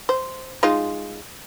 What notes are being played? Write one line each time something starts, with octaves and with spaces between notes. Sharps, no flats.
C5
G#3 D#4 F4